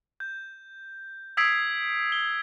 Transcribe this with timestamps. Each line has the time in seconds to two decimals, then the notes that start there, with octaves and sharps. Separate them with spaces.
0.20 G6
1.37 D#6 E6 G#6 B6 C7 D7
2.12 G7